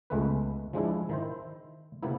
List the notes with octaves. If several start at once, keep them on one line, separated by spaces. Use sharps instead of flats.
C#2 G#3 A3 B3 B4
F3 G#3 D4 E4
D#3 E4 C5
C3 A#3 B3 E4